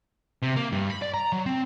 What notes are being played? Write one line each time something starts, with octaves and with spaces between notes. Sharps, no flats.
C3
A#3
G2
B5
D5
A#5
F#3
C4